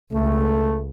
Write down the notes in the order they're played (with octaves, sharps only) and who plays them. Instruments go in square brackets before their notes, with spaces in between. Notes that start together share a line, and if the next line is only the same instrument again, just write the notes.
[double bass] C#2 [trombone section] A3